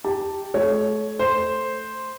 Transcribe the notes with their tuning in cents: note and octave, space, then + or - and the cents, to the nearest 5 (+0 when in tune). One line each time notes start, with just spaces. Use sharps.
G4 +0 A5 +5
A3 -40 C#5 +0
A3 +0 C5 +0